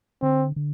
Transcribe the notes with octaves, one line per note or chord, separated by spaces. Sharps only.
D3 C4
D3